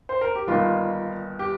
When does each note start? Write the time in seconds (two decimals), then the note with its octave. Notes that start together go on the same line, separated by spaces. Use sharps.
0.09 C5
0.21 A#4
0.35 G4
0.47 G1 G2 D#3 A#3 D#4 F4
1.39 G4